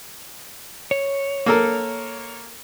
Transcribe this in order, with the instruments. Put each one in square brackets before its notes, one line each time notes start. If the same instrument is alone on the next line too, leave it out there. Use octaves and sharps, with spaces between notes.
[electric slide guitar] C#5
[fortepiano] A#3 A4 A#4